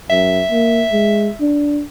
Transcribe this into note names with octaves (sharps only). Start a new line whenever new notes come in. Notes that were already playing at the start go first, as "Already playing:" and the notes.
F#2 E5
A#3
G#3
D4